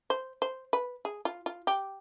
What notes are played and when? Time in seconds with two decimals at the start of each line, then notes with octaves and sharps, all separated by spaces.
0.10 C5
0.42 C5
0.73 B4
1.05 G#4
1.25 F4
1.46 F4
1.67 G4